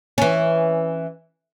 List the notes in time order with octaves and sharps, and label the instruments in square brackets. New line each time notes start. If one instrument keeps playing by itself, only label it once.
[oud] E3 C#4